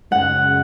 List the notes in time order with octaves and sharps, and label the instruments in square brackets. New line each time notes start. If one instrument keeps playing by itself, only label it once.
[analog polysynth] F#2 C#3 G#3 [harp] F#5